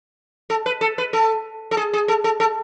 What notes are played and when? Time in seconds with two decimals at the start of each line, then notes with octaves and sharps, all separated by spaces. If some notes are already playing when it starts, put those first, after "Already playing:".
0.50 A4
0.66 B4
0.81 A4
0.98 B4
1.13 A4
1.71 A4
1.77 G#4
1.93 G#4
2.08 A4
2.24 A4
2.40 A4